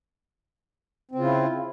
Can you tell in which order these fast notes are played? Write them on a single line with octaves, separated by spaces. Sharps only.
C4 C#3 F4 E4